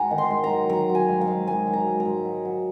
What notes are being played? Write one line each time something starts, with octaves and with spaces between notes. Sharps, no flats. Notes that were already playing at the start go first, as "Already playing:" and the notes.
Already playing: G#2 F#5 G#5 A#5
D#3
C6
G#2
A#5
F#3
F#3 A#5
F#3
G#5
G#2
F5
G#2
G#2 G#5
F#3
A#5
G#2
A#5
G#2
F#3
F#3